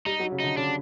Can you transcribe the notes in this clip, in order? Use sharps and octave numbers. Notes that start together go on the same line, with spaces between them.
G3 D#4
F#3
C#3
D3 D#4
C#3 D4